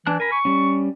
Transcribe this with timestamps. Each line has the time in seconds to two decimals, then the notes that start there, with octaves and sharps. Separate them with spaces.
0.07 E3 D4 A5 F#6
0.20 A#4 G#5 B5
0.32 C#6
0.45 G3 C#4